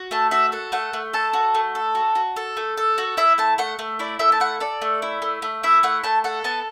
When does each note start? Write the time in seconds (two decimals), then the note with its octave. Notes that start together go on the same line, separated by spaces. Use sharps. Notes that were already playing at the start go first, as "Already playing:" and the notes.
Already playing: F#4
0.11 A3 A5
0.31 F#4 E5
0.52 A4 F#5
0.72 A3 F#5
0.93 A3
1.13 A4 A5
1.33 F#4
1.55 A3
1.75 A4
1.95 F#4
2.15 F#4
2.36 A4
2.57 A3
2.77 A4
2.98 F#4
3.17 E4 E5
3.38 A3 A5
3.58 A3 F#5
3.79 A3
3.99 E4 D5
4.19 A3 E5
4.32 A5
4.40 E4 F#5
4.60 A4 D5
4.82 A3
5.02 E4
5.22 A3
5.42 A3
5.63 E4 E5
5.83 A3 F#5
6.04 A3 A5
6.24 A4 F#5
6.44 B3 A5